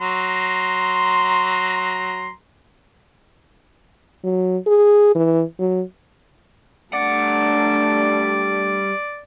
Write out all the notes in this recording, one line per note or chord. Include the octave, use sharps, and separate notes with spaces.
F#3 A#5 C6
F#3
G#4
E3
F#3
G3 A3 D4 D5 F#5